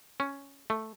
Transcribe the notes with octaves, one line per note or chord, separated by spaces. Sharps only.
C#4
A3